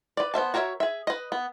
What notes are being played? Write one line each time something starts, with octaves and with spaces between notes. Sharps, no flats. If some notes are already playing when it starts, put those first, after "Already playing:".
B4 D5
B3 C5 E5 A5
F#4 A#4 C#5 D#5 E5
G#4 E5
B4 D#5
B3